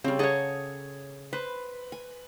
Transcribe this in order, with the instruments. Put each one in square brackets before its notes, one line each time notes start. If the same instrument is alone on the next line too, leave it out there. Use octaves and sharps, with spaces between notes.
[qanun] C#3 G3 [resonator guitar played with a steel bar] C4
[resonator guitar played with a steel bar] G#4 C#5 [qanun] A4 F#5 A#5
[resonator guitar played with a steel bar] B4 [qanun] C5
[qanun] G#5